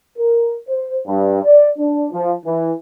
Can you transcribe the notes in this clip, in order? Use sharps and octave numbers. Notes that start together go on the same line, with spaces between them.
A#4
C5
G2
D5
D4
F3
E3